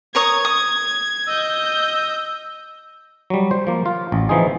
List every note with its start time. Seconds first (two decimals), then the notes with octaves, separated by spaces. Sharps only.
0.15 A#4 C#5 D#6 G#6
0.45 D#6
1.28 D#5 E6 G6
3.30 F#3 G3
3.51 C5
3.67 F3 A#3
3.86 F4
4.12 A1
4.29 E3 F3 C4 D#4 G#4